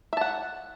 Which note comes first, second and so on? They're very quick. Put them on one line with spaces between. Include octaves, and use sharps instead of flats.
E5 A5 F#5